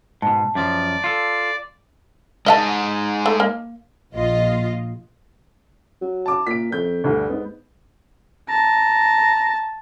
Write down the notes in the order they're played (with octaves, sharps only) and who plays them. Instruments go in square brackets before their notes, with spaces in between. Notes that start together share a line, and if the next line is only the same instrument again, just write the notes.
[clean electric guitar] G#2 B2 [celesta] A5
[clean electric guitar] F#2 F3 [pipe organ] D5
[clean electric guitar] F4 A4
[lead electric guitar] G#3 D#4 [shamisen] D#5 E5 A5
[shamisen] A3
A#3
[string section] A#1 F4 D#5
[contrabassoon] F#3
[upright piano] A5 D6
[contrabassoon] A#2 [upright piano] B6 D7
[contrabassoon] F2 [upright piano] G6
[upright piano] D2 G2 [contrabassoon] D3
[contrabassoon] G#2 [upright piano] B3
[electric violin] A5 [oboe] A#5